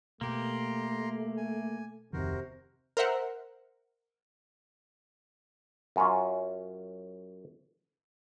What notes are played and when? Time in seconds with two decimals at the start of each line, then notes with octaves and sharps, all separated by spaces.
0.21 B2 A3 A#3 G4 A#5 C6
1.37 G#5
2.13 D1 F2 C3 D#3 F#4 A#4 C5
2.97 A#4 C5 E5 F#5
5.96 F#2 C#4 F4